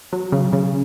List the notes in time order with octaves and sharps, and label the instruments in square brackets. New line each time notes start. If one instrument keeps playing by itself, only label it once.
[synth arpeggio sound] F#3
C#3
C#3